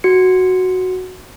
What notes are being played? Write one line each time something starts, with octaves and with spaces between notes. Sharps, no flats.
F#4 C#7